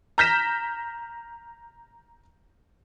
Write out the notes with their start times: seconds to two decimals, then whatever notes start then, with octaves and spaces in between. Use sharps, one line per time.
0.18 A#5 F6 G6 A#6 B6 E7